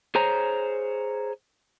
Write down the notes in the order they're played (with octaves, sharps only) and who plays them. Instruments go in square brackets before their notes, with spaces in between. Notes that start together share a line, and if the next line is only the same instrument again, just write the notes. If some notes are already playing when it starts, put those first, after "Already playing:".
[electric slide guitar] G#4 C5 C#5 A#5